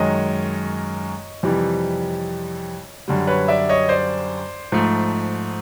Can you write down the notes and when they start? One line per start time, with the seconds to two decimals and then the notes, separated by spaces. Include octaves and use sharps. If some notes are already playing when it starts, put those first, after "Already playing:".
Already playing: F#2 D#3 G#3 C#5 D#5
1.43 F2 C3 E3 G3
3.08 F#2 D3 G3
3.27 B4 C#5
3.48 D5 E5
3.69 C#5 D#5
3.89 C5 D5
4.72 G#2 F3 A3